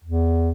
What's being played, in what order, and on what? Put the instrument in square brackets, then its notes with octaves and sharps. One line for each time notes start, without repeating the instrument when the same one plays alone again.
[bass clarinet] E2